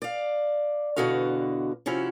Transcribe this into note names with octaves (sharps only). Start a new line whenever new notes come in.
D5 F5
E2 B2 D3 F#4 D#5 F5
C3 F3 C#4 E4 F#4